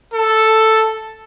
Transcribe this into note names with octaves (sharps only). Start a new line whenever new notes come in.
A4